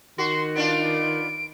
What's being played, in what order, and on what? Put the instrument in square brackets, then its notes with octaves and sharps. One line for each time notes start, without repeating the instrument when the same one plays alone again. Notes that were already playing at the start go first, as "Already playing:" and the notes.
[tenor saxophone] D#3 [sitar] F#4 [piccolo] C6
[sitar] B3 D4 F4 [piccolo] D7